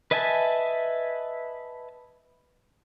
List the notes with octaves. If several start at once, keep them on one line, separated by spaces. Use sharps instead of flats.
B4 D#5 E5 G#5 A5